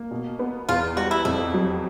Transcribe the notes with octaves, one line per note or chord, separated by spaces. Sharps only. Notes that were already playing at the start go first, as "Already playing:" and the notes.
Already playing: A#3
B2
B3
E2 F4
G3 F#4
E4
F2 E4
F#3